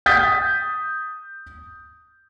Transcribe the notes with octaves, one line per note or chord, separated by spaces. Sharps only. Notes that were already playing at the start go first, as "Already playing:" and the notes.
D#6 G6 A6 B6